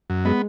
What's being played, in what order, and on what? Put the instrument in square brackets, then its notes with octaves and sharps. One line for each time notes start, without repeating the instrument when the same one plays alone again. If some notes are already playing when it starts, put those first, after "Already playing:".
[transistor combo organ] F#2
[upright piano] G#3 [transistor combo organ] B3